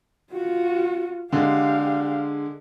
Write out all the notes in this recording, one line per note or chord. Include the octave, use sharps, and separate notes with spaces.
F4 F#4
D3 G#3 G4 F5